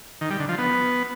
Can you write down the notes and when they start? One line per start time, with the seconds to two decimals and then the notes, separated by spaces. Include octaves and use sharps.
0.21 D#3
0.30 G3
0.40 D3
0.49 F3
0.58 B3